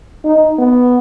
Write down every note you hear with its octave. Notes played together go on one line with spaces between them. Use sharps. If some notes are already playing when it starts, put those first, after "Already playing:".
D#4
B3